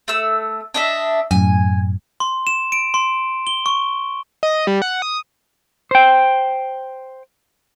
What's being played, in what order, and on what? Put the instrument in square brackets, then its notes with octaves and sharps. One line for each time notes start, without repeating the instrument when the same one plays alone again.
[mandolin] A3 E6
D4 D#5 E5
[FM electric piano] F#2 A2 [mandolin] G#5
[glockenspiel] C6
E7
D7
C6
G7
C#6
[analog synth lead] D#5
G3
F#5
D#6
[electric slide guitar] C5 G5